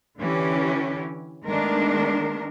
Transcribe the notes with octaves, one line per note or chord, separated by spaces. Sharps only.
D3 E3 C#4 G4
D#3 G#3 A3 B3 D4 A#4